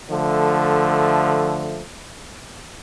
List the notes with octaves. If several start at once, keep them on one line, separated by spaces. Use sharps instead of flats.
D3 F3 A3